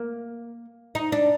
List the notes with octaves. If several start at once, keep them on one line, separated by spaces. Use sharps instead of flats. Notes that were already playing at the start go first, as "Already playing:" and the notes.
Already playing: A#3
D#4
D4